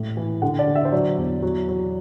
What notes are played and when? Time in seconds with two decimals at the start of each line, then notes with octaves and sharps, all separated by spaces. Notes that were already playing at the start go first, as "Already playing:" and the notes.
Already playing: A2
0.17 E3
0.42 D3 F#5
0.59 D5
0.67 D3
0.75 E5
0.85 C5
0.92 F#3 D5
1.18 E2
1.42 F#3
1.68 F#3